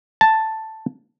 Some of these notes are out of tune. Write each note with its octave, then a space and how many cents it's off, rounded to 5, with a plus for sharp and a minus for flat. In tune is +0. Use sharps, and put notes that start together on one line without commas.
A5 +5